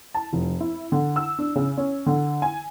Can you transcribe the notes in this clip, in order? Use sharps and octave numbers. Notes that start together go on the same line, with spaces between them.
A5
F1
E4
D3
E6
D4
C#3
C#4
D3
G#5